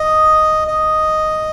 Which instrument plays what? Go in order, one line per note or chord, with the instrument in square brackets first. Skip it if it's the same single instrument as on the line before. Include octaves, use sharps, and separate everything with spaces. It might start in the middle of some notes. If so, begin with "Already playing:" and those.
Already playing: [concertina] D#5 [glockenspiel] D#6
[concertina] D#5